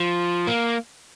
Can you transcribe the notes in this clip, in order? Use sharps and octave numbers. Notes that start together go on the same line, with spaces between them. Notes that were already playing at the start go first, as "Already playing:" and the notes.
Already playing: F3
A#3